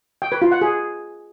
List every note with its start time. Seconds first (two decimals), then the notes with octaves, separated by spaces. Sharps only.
0.22 G5
0.32 B4
0.42 F4
0.52 F#5
0.61 G#4